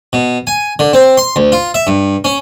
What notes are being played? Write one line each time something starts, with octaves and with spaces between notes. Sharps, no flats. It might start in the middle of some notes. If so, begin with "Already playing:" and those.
B2
G#5
D3
C4
C6
D2
F4
E5
G2
C#4